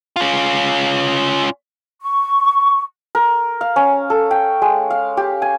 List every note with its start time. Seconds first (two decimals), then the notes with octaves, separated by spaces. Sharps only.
0.16 C#4 F4
2.02 C#6
3.15 A#4
3.61 F5
3.76 C#4
4.10 A4
4.31 G5
4.62 G#3
4.90 F5
5.17 G4
5.42 G#5